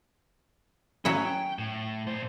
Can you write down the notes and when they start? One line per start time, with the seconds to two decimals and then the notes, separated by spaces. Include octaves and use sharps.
1.05 F#3 C#4 E4 C#5
1.25 G5
1.59 A2
2.07 A#2 C5